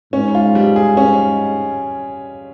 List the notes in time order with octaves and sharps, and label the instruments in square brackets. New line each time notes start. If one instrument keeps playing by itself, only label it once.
[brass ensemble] G#2 [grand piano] C#4
[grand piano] F4
G3
G#4
C#4